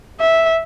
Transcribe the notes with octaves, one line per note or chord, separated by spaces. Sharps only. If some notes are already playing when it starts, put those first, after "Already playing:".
E5